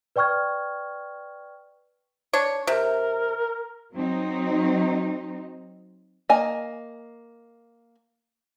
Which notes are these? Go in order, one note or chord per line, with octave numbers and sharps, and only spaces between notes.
B4 D5 G5 C#6 F6 G#6
D4 C#5
C3 A#4
F#3 C4 D#4
A#3 D#5 G#5